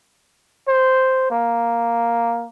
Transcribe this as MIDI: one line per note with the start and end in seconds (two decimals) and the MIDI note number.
0.68 1.27 72
1.31 2.48 58